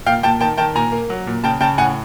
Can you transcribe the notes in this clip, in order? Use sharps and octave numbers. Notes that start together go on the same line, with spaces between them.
A#2 F5 G5
A#2 G5 A5
D#3 G5 A5
D#3 G5 A5
A#2 G#5 A#5
A#3
F#3
A#2
C#3 G5 A5
C#3 G5 A5
A2 F#5 G#5